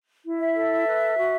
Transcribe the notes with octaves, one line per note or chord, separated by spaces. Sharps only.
E4
E5
A4
B4
F#4